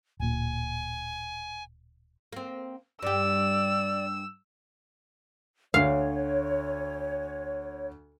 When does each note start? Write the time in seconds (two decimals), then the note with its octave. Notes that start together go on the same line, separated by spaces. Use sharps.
0.20 D1 A#2 G#5
2.33 A#3 C4
3.03 G2 G4 D5 E6
5.74 D2 C#5 F5